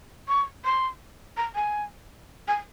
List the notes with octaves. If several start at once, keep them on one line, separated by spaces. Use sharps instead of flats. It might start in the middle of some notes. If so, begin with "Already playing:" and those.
C#6
C6
A#5
G#5
G#5